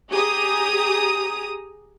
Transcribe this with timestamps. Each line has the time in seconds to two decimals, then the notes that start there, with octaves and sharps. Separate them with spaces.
0.11 G4 G#4 A#5 D#6